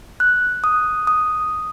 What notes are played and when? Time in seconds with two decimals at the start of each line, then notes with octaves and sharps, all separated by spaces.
0.20 F#6
0.64 D#6
1.07 D#6